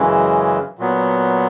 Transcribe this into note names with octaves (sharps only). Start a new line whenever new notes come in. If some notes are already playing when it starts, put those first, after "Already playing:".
Already playing: F#2 C#3 E3 G#3
A#2 F#3 B3